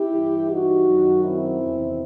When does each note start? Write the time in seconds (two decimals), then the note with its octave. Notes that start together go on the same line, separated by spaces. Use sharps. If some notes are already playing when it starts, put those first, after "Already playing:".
Already playing: E4 G4
0.12 G2 E3
0.49 D#4 F#4
0.87 F#2 D#3 F#3
1.24 C4 E4
1.61 E2 C3 D#3